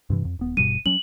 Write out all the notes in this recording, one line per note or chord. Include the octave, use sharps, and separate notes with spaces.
G2 C3 E3
F2
D#1 B3
D#1 G2 B2 D#7
F#3 C#4 F#7